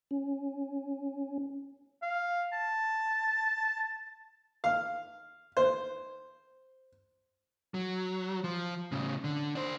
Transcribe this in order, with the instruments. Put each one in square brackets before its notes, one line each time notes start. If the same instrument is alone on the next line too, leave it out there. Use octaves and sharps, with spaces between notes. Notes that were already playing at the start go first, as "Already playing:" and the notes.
[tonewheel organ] C#4
[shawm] F5
A5
[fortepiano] F5
C5
[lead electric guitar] F#3
F3
A2 C#3
D3
D4 C5